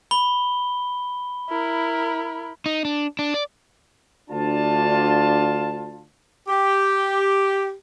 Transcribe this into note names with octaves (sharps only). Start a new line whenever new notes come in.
B5 G7
E4 A#4
D#4
D4
D4
D5
D2 D4 F4 A5
G4